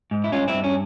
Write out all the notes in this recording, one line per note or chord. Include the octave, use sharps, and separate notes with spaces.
G#2
E4
G2 C#4 F4
C4 E4
G2
C#4